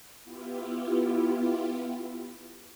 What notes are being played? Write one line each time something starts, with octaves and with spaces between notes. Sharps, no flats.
B3 E4 F4 G4